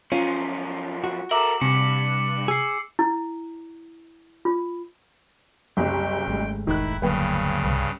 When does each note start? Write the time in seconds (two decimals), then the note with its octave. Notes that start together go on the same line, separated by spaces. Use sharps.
0.12 F#2 F3 C#4 F4
1.04 F#4
1.31 A4 A#4 E5 D6 F#7
1.61 G2 C3 C#7
2.48 G#4 E6 C7
2.99 E4
4.45 F4
5.77 F#1 C2 G5
6.28 G#1 G#3 A3
6.67 E1 D#3 E4 F#6
7.02 D2 G2 C#3 F#3 A#3 B4 G5
7.64 C2